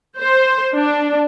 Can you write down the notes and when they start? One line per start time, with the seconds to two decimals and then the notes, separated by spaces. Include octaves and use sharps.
0.19 C5
0.75 D4